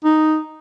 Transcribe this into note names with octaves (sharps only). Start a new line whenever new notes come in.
D#4